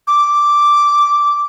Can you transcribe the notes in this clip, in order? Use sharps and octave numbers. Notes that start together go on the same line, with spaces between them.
D6